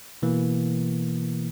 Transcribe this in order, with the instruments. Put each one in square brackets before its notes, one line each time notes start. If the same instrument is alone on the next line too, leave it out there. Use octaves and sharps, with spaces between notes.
[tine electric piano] B2 E3 A#3